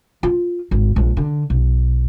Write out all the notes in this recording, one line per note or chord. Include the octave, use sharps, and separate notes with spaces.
F4
G#1
A#1 G#3
D3
B1